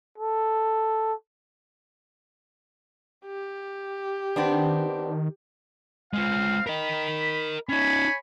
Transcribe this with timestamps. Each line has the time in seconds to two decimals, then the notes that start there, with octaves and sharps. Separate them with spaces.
0.18 A4
3.25 G4
4.36 D#3 B3 C4 D4
6.14 G#3 C4 F4 F5
6.67 A#4 D#5 B5
7.69 C#4 D#4 C#5 G#5 B5